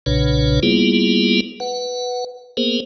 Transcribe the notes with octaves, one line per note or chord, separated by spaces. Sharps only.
B1 A#2 C#3 D4 B4 C#5
G3 A#3 B3 E4 F4 G#4
B4 F#5
A#3 B3 G#4 A#4 C5